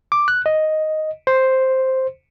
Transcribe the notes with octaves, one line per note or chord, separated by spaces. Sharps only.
D6
F#6
D#5
C5